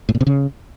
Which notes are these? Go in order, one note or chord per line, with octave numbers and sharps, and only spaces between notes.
A2
A#2
C3
C#3